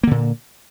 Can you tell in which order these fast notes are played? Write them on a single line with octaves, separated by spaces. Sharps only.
A#3 D3 A#2